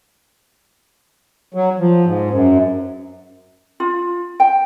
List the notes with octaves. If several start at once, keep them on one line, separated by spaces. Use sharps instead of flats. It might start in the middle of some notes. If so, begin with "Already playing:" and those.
F#3
F3
G#2
F#2
F4
G5